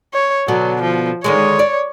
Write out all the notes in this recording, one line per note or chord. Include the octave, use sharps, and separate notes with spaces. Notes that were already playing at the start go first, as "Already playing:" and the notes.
C#5
B2 D3 F#3 B3
F3
D3 D#3 G#3 C#5
D5